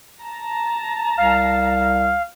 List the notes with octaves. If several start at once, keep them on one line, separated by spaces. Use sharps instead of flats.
A5 A#5
C2 F5